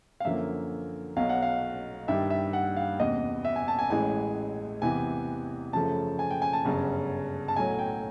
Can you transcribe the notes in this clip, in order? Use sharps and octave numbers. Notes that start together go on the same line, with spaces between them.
F5
F#2 D3 F3 A#3 E5
B1 B2 F#3 F5
F#5
F5
G2 D#3 G3 E5
E5
F#5
F5
F#1 E2 C3 D#5
E5
G#5
A5
G#5
A1 A2 E3 G#3 G#5
E2 C3 E3 G#5
F#2 C#3 F3 A3 A5
G#5
G5
G#5
A5
G1 F#2 C#3
A5
B1 A2 F#3 A3 G#5
G5